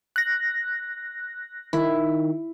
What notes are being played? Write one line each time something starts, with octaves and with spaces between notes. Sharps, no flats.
F#6 A#6
D#3 E4